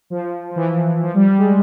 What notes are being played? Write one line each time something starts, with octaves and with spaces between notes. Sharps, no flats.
F3
F3
E3
F3
G3
G3
G#3